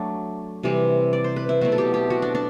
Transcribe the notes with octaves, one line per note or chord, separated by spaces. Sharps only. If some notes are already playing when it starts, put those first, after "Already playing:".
Already playing: F#3 A3 D4
C3 E3 G3 C4
D5
C5
B4
E4
B2 F#3 A3 C4 F#4
A4
G4
G4
F#4
D4
D4